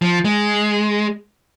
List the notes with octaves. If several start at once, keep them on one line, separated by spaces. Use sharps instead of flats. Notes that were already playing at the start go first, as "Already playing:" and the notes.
F3
G#3